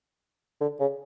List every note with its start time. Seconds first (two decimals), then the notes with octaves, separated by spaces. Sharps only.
0.61 D3
0.80 C#3